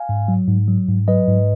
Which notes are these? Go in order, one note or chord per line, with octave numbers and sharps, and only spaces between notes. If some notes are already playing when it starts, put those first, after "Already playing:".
Already playing: F5 G#5
G#2
F#3
G#2
F#3
G#2
F#3 B4 D#5
G#2